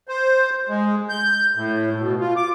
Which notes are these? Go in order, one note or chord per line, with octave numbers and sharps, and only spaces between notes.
C5
G#3
G6
A2
B2
F4
D6